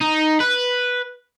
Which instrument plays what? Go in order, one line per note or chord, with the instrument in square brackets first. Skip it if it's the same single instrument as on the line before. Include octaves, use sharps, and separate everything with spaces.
[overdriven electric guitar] D#4
B4